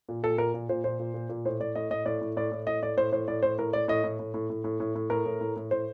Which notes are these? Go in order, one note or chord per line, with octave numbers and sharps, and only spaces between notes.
A#2
A#2 A4
A#2 A#4
A#2
A#2 C5
A#2 C5
A#2
A#2
A#2
A2 C5
A2 D5
A2 D#5
A2 D#5
A2 D5
A2
A2 D5
A2
A2 D#5
A2 D5
A2 C5
A2 C5
A2 D5
A2 C5
A2 A#4
A2 D5
A2 D#5
A2
A2
A2
A2
A2
A2
A2
A2 A#4
A2
A2
A2
A2 C5